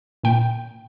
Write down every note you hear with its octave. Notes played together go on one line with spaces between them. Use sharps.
A#2 G5